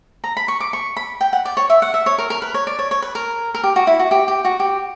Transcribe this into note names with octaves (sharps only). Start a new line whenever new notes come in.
A#5
B5
C#6
D6
C#6
B5
G5
F#5
D5
C#5
E5
F#5
E5
C#5
A#4
A#4
B4
C#5
D5
C#5
C#5
B4
A#4
A#4
G4
F#4
E4
F#4
G4
G4
F#4
G4